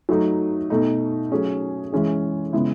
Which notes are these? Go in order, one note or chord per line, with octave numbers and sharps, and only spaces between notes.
F#3 A3 D#4
B2 A3 D#4
F#3 A3 C#4 G#4
E3 G#3 C#4 G#4
C#3 G#3 B3 E4